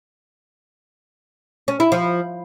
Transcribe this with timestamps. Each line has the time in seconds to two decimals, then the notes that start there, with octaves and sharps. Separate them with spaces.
1.68 C#4
1.80 E4
1.92 F3